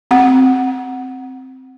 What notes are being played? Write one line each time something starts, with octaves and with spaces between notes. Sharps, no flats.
C4 F#5